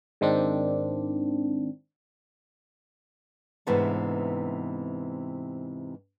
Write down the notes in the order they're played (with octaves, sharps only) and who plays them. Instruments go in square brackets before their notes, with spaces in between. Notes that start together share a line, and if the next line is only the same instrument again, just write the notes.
[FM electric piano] G#2 D#3 C4 D4
[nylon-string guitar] G#2 C3 E3 A3 B3 D4